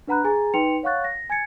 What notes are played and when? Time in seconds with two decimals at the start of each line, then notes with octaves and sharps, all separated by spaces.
0.07 D4 B4 F#5 A#5 B5 F#6
0.24 G#4 G#5 A#5 A6
0.54 D#4 B4 G5 C6 C#7 F7
0.83 C#5 F5 F#5 C#6 F#6 A6
1.04 A#6
1.30 G#5 G#6 A6 C#7